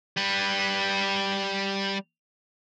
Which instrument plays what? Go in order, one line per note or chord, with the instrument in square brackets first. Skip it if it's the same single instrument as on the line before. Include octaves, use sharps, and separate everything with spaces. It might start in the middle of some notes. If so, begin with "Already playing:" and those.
[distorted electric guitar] G3 B4